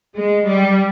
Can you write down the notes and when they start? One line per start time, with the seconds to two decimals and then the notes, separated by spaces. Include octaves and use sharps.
0.16 G#3
0.47 G3